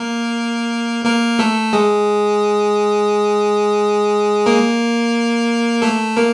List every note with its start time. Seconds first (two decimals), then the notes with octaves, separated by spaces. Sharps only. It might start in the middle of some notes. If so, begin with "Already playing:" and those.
Already playing: A#3 A#4
1.05 A#3 A#4
1.39 A3 A4
1.73 G#3 G#4
4.46 A#3 A#4
5.82 A3 A4
6.17 A#3 A#4